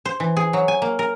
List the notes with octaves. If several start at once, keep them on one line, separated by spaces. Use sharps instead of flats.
C5
E3
G#4
F#3
G#5
A#3
A#4